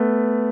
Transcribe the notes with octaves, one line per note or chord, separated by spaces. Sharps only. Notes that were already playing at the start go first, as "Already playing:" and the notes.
Already playing: A3 B3